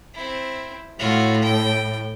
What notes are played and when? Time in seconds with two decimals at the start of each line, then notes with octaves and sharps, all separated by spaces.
0.14 C4 E4
0.99 A2 F4 F#4
1.42 G5